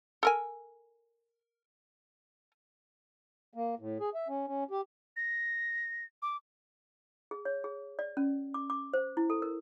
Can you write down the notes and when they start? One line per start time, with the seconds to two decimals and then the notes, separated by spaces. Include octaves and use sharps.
0.23 A4 A#4 G#5
3.54 A#3
3.79 A2
4.00 G#4
4.14 E5
4.28 C#4
4.47 C#4
4.71 G4
5.16 A#6
6.22 D6
7.31 G#4
7.45 C#5
7.64 G#4
7.99 D5
8.17 C#4
8.54 D6
8.70 D6
8.94 C5
9.17 E4
9.30 A4
9.42 A#4